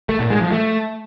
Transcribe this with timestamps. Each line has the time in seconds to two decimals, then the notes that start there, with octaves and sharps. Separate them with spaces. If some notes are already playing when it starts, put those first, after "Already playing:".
0.09 A3
0.20 A#2
0.30 G#3
0.41 F3
0.52 A3